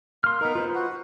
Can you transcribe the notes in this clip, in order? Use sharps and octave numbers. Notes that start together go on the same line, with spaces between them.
A#3 C6 F6
B3 D#4 A#4
F4 B4 C5
F#4 F#5